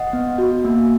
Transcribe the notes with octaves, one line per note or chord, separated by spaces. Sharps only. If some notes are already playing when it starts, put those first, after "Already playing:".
Already playing: D#5 F#5
B3
F#4
A#3